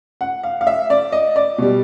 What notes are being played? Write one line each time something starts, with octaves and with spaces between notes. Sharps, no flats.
F#5
F5
F5
E5
D5
D#5
D5
B2 G3